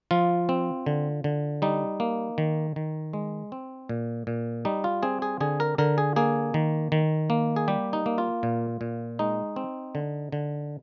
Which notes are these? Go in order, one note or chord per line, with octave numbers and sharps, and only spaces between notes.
F3 F4
C4
D3
D3
G3 D#4
A#3
D#3
D#3
G#3
C4
A#2
A#2
G3 D#4
F4
C4 G#4
G#4
D3 G#4
A#4
D3 A#4
G#4
A#3 G#4
D#3
D#3
A#3
G#4
G3 G4
D#4
A#3
F4
A#2
A#2
G#3 D#4
C4
D3
D3